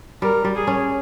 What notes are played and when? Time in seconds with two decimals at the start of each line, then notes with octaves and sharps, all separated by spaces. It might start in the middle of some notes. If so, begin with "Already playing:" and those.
0.22 G3 A#4
0.44 G3
0.56 G#4
0.67 C#4